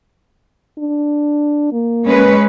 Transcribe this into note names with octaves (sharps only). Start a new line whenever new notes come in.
D4
A#3
G#3 C#4 B4